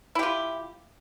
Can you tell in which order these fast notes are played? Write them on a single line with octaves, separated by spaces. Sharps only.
E4 G4 F4